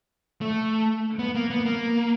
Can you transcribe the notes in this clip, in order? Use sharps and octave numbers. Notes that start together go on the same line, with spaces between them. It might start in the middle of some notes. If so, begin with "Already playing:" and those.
A3
B3
A#3
B3
A#3